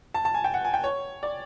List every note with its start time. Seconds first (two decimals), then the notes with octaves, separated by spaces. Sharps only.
0.14 A5
0.25 A5
0.34 G#5
0.44 G5
0.54 F#5
0.65 G#5
0.74 G5
0.84 C#5
1.23 D5